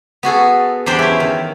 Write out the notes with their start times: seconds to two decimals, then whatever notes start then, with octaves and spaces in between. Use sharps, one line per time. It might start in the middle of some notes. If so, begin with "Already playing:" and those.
0.23 B3 F#4 G#4 A4
0.86 E2 G3 D4 B4 C5 G5
0.99 C#4 E4
1.20 D#3